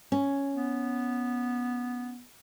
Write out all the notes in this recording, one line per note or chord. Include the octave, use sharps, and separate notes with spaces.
C#4
B3